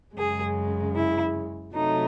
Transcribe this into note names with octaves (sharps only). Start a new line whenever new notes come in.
F#2 C#3 G#3 G#4
E4
C3 F#3 A3 D#4